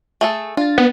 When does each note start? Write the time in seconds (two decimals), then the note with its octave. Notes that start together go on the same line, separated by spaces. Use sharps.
0.21 A3 G#4 A4
0.57 D4 F4 A6
0.78 B3